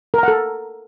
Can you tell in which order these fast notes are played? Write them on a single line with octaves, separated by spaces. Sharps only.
A#4 A#5 F#5 A4